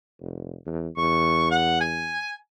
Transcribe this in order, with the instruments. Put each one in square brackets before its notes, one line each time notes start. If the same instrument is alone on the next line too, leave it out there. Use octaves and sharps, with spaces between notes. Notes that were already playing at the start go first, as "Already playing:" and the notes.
[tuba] F1
E2
[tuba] E2 [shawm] C#6
[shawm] F#5
G#5